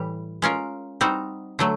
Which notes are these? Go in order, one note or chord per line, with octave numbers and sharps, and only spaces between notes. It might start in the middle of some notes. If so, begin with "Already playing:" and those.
Already playing: A2 E3 G3
G#3 C#4 F4 A#4
G3 C4 D#4 F#4
D3 F#3 A3